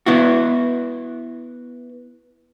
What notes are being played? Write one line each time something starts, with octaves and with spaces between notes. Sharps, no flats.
B3 E4 F#4